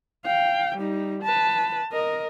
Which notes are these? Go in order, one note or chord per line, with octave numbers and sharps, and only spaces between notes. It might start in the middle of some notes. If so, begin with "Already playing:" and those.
F5 G5
G3 D#4
B4 A5
A#4 D#5